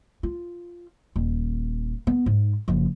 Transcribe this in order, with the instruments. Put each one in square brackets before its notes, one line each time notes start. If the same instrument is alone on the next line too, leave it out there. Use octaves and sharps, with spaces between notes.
[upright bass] F4
D#1
B3
G#2
F#1 F3